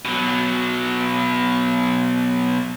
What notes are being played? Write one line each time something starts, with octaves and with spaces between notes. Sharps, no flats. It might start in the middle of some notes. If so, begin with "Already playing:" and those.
B2 F#3